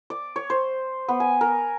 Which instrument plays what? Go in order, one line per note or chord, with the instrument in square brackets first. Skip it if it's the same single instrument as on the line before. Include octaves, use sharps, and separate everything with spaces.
[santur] D5
C#5
C5
B3
G#5
A#4